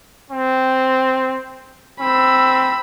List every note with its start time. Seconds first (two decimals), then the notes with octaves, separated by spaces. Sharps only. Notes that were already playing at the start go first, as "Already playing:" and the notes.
0.30 C4
2.00 C4 B5 E6